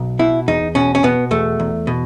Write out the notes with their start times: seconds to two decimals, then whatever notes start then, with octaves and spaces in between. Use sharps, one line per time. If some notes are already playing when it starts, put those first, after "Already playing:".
Already playing: B1
0.19 B2 E4
0.48 E2 D#4
0.75 B2 C#4
0.95 C#4
1.03 B2 B3
1.31 E2 A3
1.60 E2
1.87 B2